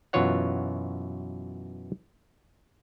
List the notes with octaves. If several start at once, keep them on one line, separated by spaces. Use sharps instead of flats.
F#2 B2 E3 F4 C#5 F#5